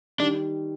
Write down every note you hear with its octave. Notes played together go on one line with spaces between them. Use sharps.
D#3 G3 D4